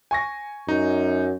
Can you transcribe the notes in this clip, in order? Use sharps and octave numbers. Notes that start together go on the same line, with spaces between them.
G#5 C#6 A#6
F#2 D#4